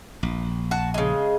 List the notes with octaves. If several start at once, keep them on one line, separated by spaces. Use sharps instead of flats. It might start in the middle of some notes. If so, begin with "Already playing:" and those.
A#1
F#4 A5
C#3 G#3